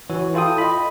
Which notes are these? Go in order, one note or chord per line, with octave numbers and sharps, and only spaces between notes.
E3 F#4 C#5
E4 F4 A4 G5 D#6
D#5 B5